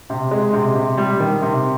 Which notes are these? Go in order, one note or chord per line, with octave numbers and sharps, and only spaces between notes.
C3
G#3
C3
C3
G3
D#3
C3